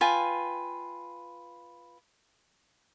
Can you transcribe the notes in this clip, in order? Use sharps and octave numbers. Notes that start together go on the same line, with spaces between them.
F4 B4 G5 G#5